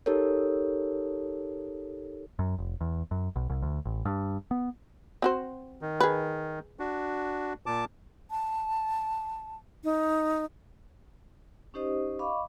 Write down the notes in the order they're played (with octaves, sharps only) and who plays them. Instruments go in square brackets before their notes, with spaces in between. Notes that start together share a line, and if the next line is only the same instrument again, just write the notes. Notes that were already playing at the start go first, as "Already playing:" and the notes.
[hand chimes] D#4 G4 A4 A#4 C#5
[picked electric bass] F#2
F1
E2
F#2
B1
C2
D2
A1
G2
B3
[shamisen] C4 F#4 C5
[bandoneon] D#3
[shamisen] G#4 B4
[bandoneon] D4 F#4
A#2 A5 D6
[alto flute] A5
D#4
[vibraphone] C#4 D#4 G4 C5 D#5 D#6
D#5 F5 B5 C#6 D6